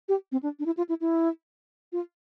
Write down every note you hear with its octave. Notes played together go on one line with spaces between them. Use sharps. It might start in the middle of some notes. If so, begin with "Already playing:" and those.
G4
C4
D4
D4
E4
F4
E4
E4
F4